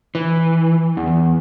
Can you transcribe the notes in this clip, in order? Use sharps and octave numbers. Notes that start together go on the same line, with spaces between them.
E3
E2